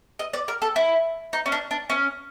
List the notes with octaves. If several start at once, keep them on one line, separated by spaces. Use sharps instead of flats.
D#5
D5
A#4
A4
E4
D#4
C#4
D4
D4
C#4